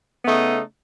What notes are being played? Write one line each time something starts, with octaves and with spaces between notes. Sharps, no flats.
C#3 A3 B3 D#4